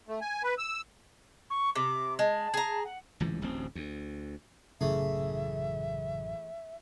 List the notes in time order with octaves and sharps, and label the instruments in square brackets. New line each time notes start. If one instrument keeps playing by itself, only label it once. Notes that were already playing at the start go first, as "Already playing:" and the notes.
[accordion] A3
G#5
B4
E6
[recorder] C#6
[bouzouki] C3 [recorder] D6
[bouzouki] G#3 [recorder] A5
[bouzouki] G#4 A#5
[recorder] F#5
[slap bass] D1 C#2 G#2 E3
D1 A1 D2 C4
D2
[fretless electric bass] A1 F#2 [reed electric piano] C#3 [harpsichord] E3 A3 G#4 [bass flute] E5